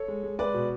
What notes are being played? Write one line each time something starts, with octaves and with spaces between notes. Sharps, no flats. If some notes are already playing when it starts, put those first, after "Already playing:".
Already playing: A4 C#5
G#3
G#3
G#3 B4 D5
B2